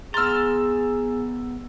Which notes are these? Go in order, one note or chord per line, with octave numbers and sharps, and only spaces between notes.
B3 G#4 A#5 C6 E6 F6 A6